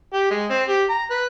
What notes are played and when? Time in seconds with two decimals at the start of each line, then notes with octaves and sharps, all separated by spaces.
0.14 G4
0.31 G#3
0.50 C4
0.68 G4
0.90 A#5
1.11 B4